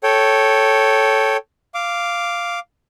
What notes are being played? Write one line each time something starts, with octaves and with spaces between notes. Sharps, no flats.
A4 C#5 G5
F5 D6